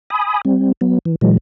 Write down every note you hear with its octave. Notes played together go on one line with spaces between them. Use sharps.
G#5 B5 D#6
G3 C4
F#3 B3
E3
A#2 E3 F#3 G#3